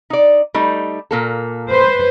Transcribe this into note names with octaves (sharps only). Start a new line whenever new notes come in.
D#4 D5
G3 A3 D#4
A#2 A#3 A4
B4 C5